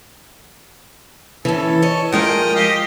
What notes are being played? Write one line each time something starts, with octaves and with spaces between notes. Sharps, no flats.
E3 C#4 A4
C#5 D#5
F3 G#3 A#4 D#5 G5
G4 D#5 F5